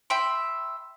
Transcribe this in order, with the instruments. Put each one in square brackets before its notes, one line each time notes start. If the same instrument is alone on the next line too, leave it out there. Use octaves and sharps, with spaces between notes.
[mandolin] E5 G5 B5 C6